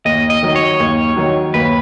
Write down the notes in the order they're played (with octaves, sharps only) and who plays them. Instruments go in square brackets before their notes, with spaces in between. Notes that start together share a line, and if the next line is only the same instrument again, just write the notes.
[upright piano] D#2 [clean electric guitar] D#5
[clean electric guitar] D#5
[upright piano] D#3 F#3
[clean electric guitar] C#5
[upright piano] D#2
D#3 F#3
[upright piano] D#2 [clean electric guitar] B4